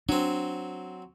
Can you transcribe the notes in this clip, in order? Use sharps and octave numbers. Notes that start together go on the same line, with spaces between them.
F#3 C4 D4